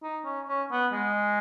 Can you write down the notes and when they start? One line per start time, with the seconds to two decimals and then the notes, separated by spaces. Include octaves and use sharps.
0.03 D#4
0.25 C#4
0.48 C#4
0.71 B3
0.93 G#3